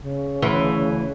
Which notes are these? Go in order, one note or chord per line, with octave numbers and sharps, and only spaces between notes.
C#3
D2 E3